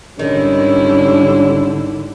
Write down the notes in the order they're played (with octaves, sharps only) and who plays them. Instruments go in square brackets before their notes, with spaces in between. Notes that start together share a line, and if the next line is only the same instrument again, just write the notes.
[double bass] G#1 D3 [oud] D#3 [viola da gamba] G3 E4 [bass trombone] C#4